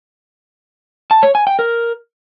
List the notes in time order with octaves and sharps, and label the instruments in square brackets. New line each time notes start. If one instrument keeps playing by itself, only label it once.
[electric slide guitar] A5
C#5
G#5
G5
A#4